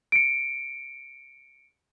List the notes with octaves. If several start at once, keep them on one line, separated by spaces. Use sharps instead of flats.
C#7 D7